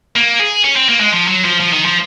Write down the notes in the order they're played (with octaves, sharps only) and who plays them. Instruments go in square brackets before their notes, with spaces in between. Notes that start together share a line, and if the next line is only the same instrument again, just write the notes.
[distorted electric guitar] A#3
G#4
C#4
C4
A#3
G#3
F3
F#3
F3
F3
D#3
F3